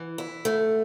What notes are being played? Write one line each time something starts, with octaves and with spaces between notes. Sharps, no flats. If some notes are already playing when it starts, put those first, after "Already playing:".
Already playing: E3
E4
A3